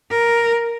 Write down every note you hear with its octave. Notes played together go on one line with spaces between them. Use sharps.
A#4